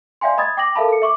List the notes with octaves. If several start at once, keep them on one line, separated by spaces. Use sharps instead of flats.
D5 E5 F5 G5 G#5 C6
D#5 B5 D#6 G#6 A6
G5 D6 A#6 F#7
A4 A#4 E5 F5 A5 B5
A4 C#7
E5 C#6 D6